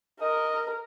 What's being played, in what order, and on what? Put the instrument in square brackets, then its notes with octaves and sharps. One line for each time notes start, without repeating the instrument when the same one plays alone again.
[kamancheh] A#4 [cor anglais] D#5